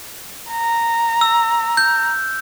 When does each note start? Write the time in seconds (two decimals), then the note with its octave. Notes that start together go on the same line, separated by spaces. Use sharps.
0.51 A#5
1.21 E6
1.77 G6